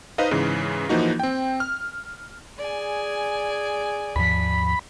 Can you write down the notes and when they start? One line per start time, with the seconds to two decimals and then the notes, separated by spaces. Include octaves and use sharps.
0.18 D#4 B4 C5 D#5 F5
0.31 G#2 C#3 E3
0.89 E3 F3 A#3 D#4 F#4
1.19 C4 G5
1.60 F6
2.57 G#4 D5 G#5
4.16 D#2 G#2 F3 B5